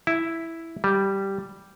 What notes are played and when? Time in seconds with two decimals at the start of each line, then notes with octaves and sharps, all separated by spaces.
0.07 E4
0.84 G3